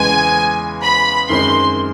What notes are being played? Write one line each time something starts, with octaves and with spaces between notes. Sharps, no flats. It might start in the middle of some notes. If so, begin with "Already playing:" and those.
Already playing: E2 C#3 E3 G#3 B3 G#5
B5
F#2 D#3 G#3 C4 C6